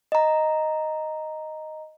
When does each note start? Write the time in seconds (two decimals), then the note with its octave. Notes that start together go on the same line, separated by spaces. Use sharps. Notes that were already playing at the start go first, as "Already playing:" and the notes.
0.12 D#5 A#5